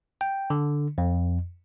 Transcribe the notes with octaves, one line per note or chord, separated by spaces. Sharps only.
G5
D3
F2